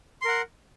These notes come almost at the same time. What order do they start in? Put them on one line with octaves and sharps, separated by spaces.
C6 A#4 F#5